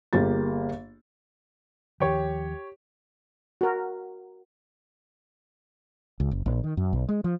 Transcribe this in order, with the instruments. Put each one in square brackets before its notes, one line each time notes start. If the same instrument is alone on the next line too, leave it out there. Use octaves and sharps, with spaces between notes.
[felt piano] G1 A#3 G4 G#4 A6
[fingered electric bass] D#2 D#3 F3 [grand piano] G4 C#5
[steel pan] F#4 A#4
[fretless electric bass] C#2
F#1
A#1
D#3
F#2
B1
G#3
F3